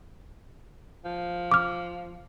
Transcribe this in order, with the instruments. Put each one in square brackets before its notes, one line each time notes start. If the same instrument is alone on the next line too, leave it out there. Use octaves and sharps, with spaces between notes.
[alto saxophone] F3
[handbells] D6 F6